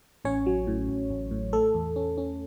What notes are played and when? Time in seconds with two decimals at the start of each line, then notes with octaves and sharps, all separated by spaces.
0.25 A1 C#4 C#5
0.46 F#3
0.67 A2
0.88 A1
1.10 A1
1.31 A2
1.53 A3 A4
1.74 E2
1.96 C#4
2.18 C#4